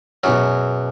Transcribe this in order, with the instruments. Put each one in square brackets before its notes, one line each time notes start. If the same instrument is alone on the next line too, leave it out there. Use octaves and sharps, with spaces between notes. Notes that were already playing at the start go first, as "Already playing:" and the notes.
[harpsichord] F#2 F#3 [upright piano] B2 B3 G#4